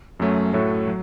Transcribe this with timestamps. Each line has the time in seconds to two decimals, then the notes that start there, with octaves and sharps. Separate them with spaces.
0.20 F#2 F#3 A3 C#4
0.53 A2 A3 F#4 A4 C#5
0.87 F#3